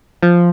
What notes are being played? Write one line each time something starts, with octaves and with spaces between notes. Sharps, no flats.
F3